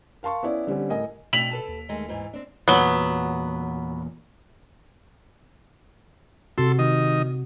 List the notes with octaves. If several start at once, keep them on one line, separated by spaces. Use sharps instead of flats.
A#4 F5 A5 C6 C#6
B3 C#4 E4 D5
D3 G3 C4 C#4
A2 A#4 D#5 G#5
B2 A3 C4 D4 B6 F7 F#7
A4 B4 A5
D#2
D#3 G#3 A3
G#2 E3
C4 D4
E2 A#2 F#3 B3
C3 F#4 A4 C6 E6
D#3 D#5